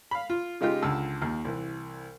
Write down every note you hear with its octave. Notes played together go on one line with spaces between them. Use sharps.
F5 B5
F4
C#3 G#3 D#4 F4 G4
C#2 D3 A5 E6
D#2
C2 E3